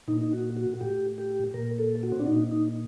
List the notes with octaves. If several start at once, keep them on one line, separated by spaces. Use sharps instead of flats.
A#2 D#4
D#4
F#4
F#4
A2 G4
G4
A#2 A#4
A4
F#4
C4
D4
A#2 D#4
D#4